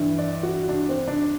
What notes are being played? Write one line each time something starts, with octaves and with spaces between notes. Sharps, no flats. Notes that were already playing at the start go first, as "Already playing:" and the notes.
Already playing: G2 E3
D5
F#4
D4
C4
D4